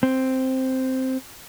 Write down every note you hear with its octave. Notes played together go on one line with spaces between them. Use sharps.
C4